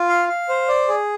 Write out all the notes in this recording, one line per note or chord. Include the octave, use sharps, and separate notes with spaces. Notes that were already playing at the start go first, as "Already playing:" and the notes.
Already playing: F4
F5
F5
C5
D5
G#4